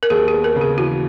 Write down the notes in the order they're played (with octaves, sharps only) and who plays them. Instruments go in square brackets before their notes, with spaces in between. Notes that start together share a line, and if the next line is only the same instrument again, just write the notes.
[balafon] A#4
[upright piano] D#2 [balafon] G#4
[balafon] G#4
[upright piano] B3
[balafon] A#4
[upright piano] C#3
[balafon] G#4
[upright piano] E3 [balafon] F#4